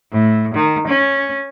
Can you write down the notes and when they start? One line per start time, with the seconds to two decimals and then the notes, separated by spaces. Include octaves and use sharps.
0.12 A2
0.55 D#3
0.88 C#4